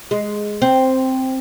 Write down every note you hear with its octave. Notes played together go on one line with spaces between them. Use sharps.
G#3
C4